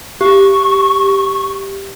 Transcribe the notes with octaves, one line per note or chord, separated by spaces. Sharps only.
G4 C#6